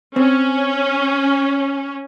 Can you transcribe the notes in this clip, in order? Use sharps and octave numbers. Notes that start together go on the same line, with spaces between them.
C4 C#4